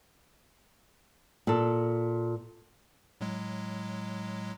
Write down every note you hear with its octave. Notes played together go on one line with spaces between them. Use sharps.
A#2 A4
A2 F#3 G#3